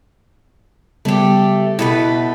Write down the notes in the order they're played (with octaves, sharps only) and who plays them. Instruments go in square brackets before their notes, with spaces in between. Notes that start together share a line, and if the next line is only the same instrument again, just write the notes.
[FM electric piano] C#3 G3 B3 [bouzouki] A3 G4
[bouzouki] B2 A3 B4 [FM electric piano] E4